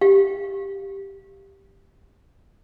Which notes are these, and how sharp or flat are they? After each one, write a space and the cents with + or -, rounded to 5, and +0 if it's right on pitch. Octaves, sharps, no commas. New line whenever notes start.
G4 +0 F5 +0